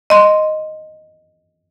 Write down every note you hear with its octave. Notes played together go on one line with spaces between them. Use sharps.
D#5 C6